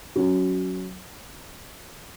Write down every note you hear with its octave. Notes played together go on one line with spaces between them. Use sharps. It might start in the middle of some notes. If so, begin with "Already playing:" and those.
F#3 C#4 F#4